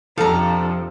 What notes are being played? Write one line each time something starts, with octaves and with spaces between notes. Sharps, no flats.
F2 C3 F3 D4 A4 F5 A#5